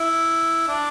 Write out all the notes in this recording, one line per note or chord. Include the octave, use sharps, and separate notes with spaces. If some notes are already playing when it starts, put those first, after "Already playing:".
Already playing: E4
D4